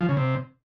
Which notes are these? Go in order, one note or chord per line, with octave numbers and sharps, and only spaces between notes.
F3
C#3
C3